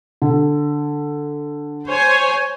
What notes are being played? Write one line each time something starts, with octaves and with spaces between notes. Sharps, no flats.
D3
C5 C#5 G#5